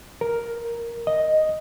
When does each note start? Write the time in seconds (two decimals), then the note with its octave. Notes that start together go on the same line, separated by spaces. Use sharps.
0.21 A#4
1.07 D#5